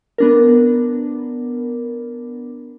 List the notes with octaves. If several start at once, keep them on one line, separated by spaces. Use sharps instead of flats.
B3 D4 A#4